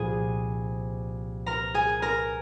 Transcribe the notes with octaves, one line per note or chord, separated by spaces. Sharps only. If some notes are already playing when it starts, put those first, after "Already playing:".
Already playing: C2 A#2 F3 G#4 G#5
A#4 A#5
G#4 G#5
A#4 A#5